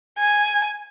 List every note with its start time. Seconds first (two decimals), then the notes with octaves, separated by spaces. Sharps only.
0.19 G#5